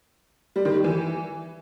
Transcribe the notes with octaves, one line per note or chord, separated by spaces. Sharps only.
G3
D#3
G3
E3